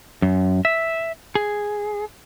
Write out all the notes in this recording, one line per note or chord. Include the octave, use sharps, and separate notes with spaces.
F#2
E5
G#4